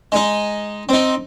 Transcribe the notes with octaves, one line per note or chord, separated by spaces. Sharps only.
G#3 D#4
C4 D#4